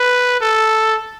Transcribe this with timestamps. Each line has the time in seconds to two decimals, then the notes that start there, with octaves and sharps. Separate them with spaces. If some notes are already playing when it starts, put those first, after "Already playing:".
Already playing: B4
0.40 A4